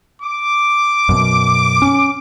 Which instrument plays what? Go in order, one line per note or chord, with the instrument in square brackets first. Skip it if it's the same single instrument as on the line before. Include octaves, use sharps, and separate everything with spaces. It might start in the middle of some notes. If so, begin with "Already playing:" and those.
[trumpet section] D6
[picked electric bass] F#2 B2
C#4